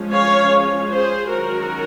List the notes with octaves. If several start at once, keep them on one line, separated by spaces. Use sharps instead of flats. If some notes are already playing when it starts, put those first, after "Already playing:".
Already playing: F3 G#3 C#4
C#5 F5
G#4 C5
D#3 F#3 C#4 F#4 A#4